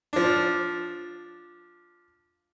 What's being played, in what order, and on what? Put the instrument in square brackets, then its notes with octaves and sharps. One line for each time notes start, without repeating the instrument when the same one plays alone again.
[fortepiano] F3 D4